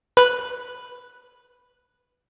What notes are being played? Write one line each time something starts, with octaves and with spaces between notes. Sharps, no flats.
B4 F#6